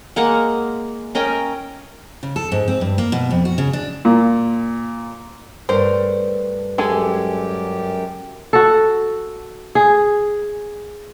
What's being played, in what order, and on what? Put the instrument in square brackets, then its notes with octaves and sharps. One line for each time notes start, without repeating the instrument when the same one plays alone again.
[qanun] G#3 A#3 A#4 F#5
C#4 A#4 D#5 G5
[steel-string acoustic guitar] C#3
A4
G#2
C4
G2
A#3
B2
F2
F#4
C#3
D4
[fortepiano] A#2
[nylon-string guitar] G2 A3 A#4 [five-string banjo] C5
[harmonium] F#2 G4 [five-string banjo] G#3 A4 G#5
[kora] F#4 A4
G#4